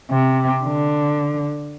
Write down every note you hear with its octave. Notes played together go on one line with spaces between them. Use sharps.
C3
D3